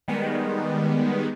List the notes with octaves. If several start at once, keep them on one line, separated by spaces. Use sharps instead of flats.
D#3 G3 G#3 B3